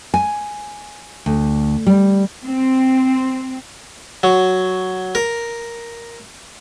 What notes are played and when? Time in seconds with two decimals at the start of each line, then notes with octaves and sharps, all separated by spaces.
0.14 G#5
1.26 D2
1.87 G3
2.46 C4
4.23 F#3
5.15 A#4